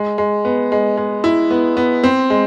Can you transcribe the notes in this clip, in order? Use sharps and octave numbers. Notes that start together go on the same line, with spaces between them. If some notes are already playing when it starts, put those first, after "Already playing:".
Already playing: G#3
G#3
B3
G#3
G#3
E4
B3
B3
C4
G#3